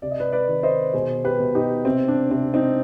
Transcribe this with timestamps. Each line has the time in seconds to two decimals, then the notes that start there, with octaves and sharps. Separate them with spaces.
0.02 C3 D5
0.11 D#5
0.20 B4 D5
0.32 B4 D5
0.48 D#3
0.63 C5 D#5
0.94 B2 G#4 C5
1.24 G4 B4
1.40 B2
1.55 D#4 G4
1.85 C3 C4
2.08 D4
2.31 C3 C4
2.54 C4 D#4